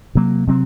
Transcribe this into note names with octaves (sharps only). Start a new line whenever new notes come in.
C3 F#3 A#3
C3 F#3 C4